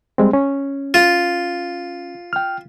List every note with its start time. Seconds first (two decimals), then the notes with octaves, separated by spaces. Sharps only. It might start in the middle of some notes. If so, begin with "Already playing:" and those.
0.18 G3 G#3 C4
0.33 C#4
0.94 F4
2.33 G5 F6